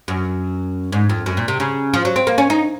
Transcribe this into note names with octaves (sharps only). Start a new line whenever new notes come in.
F#2
G#2
F2
F#2
A#2
C3
C#3
F3
F#3
C4
A#3
C#4
D#4